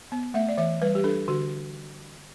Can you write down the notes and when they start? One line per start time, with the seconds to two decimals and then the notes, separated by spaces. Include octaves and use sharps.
0.12 B3
0.34 A3 E5
0.49 D5
0.58 E3 E5
0.82 G3 B4
0.95 G4
1.04 D4 A4
1.28 D3 F#4